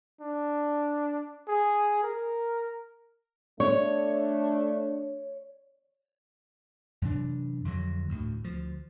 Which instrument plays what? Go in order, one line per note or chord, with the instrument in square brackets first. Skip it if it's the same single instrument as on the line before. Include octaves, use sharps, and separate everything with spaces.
[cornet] D4
G#4
A#4
[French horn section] A3 D4 [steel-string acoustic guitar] C#5
[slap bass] F#2 C3 E3 D4
F2 D3 F#3
D2 A2
D2 F3